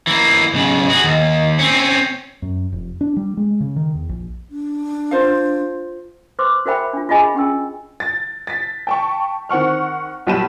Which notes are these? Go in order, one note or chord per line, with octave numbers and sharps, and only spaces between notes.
E3 A#3
B1 C#3
F#4 G#4
D#2
C4 C#4
F#2
F1
D4
G3
G#3
C#3
D#3
E2
A#1
D4
F4 C5 F5
B4 C5 C6 D6
F#4 A#4 C5 E5 G5 B5
D4 F4
F4 F#4 G#4 D#5 G#5 B5
C#4 G4 G5 E6
A6
A6 B6
G5 A5 C#6
D#3 C4 F#5 C#6 F6
B1 A#2 G3 A5 B5 E7